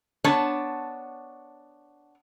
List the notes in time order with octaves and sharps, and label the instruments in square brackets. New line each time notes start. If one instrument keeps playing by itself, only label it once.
[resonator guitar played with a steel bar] B3 D4 C#5 A5